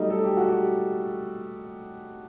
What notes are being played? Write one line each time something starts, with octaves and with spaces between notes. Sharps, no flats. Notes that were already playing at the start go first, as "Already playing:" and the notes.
Already playing: F#3 G3 A3 D#4
A4
G4
F#4
G4